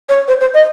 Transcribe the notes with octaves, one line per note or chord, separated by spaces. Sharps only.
C#5
C5
C5
D#5